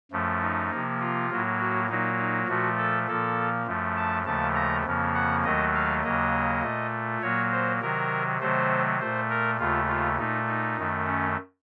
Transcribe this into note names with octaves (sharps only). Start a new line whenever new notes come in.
F#2 F3 A3
D#4
C3 F3 A#3
F4
A2 F#3 A#3
F#4
A#2 F#3 A#3 D#4
D#4
A#2 F3 A3 F#4
A4
A#2 F3 A#3 A4
F#2 F3 A3
A5
D#2 C#3 F3 A3 A5
A#5
F2 C#3 F3 A#3
F#5
D#2 D#3 F#3 A3 D#5
F5
D#2 C#3 F#3 A#3 D#5
A#2 A3
A#2 F#3 A#3 C#5
C5
C3 D#3 F#3 A#4
C3 D#3 F#3 A3 C5
A#2 A3 C5
A#4
D#2 C#3 A3 F4
F4
A#2 A3 D#4
D#4
F#2 D#3 A3
C#4